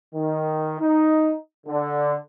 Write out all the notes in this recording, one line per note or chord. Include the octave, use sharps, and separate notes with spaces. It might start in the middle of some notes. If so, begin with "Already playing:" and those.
D#3
D#4
D3